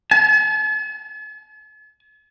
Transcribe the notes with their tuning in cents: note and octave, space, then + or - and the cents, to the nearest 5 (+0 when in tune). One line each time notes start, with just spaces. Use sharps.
A5 -45